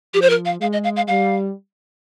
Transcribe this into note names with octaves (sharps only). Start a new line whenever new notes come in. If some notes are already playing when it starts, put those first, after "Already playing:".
F3 G4
C5
A#4
F5
G#3 F5
D#5
F5
F5
G3 F5